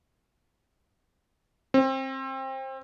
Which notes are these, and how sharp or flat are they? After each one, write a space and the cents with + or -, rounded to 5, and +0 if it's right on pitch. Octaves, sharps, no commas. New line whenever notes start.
C4 +25